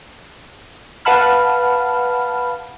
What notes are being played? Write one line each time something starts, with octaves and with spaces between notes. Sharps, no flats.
B4 F5 F#5 A5 B5 F6